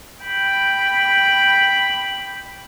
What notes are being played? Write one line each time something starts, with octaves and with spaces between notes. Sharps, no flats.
G5 B5